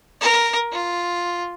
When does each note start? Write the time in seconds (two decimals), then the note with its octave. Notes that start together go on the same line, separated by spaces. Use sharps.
0.21 A#4
0.72 F4